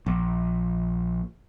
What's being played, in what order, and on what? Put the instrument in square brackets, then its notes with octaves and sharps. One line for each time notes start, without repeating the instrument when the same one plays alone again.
[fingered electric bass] A#1